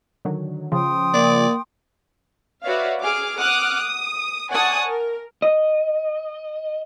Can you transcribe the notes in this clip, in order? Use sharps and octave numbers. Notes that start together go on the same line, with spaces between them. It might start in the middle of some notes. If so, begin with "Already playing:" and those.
D3 D#3 F#3
C#3 F3 G5 C6 D#6
A#3 D5
F#4 B4 C#5 D5 E5 F5
G#4 D6 F6
F#5 D6 D#6 F6 F#6
D#6
D5 F#5 G#5 A5 C#6 D#6
A#4
D#5